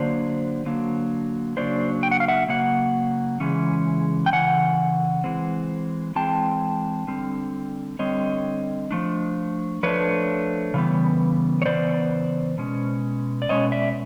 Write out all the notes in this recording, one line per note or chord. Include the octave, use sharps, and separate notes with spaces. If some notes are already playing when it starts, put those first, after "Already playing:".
Already playing: D3 F#3 A#3 D4 C5 D5
D3 F#3 A#3 D4
C#3 F#3 A#3 D4 C5 D5
G5
F#5
F5
E5 F#5
C#3 F#3 A#3 F#5
C#3 E3 G#3 C#4
G5
C#3 E3 F#5 G#5
E3 G#3 C4
E3 G#3 C4 G5 A5
D3 G3 C4
D3 G3 C4 C#5 D#5
F3 A3 D4
F3 A3 D4 B4 C#5
C#3 E3 G3 B3
C#5
C#3 E3 B3 C5 D5
B2 G#3 C#4
D5
B2 G#3 C#4 C#5 D#5
D5 E5